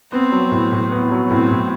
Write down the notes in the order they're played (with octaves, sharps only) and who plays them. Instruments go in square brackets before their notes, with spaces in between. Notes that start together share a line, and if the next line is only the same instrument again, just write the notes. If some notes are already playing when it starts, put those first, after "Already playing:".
[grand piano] B3 [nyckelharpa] C4
[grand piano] F#3
A2
A2
B3
F#3
[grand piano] A2 [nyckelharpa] C4
[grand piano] A2